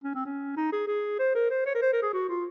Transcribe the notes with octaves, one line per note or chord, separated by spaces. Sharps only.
C#4
C4
C#4
D#4
G#4
G#4
C5
A#4
C5
C#5
A#4
C5
A#4
G#4
F#4
F4